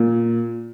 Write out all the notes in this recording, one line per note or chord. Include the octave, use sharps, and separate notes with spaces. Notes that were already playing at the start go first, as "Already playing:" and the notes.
Already playing: A#2